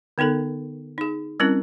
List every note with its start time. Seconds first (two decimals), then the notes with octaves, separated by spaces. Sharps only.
0.18 D3 B3 D#4 A4 A#4
0.98 D#4 G#4
1.40 G3 C4 C#4 E4 A#4